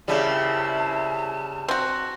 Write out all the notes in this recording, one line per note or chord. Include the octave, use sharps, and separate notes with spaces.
A#2 C#3 G3 C4 E4 A5
C4 F#4